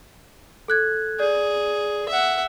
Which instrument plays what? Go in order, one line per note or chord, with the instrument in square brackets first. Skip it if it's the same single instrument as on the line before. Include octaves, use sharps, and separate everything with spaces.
[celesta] A4 F#6 G#6
[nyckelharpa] G#4 [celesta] D5
[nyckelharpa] E5 F#5